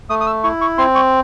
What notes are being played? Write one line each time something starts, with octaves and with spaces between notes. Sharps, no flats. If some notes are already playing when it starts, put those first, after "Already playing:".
A3 D#6
D#6
E6
E4 C#6
C#6
C4 C6
C#6